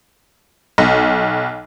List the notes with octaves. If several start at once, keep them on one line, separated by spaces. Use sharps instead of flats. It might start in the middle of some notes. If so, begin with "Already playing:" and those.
B1